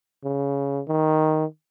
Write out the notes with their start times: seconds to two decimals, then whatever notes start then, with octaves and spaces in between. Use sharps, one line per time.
0.24 C#3
0.88 D#3